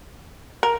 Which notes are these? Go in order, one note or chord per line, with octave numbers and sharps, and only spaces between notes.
A#4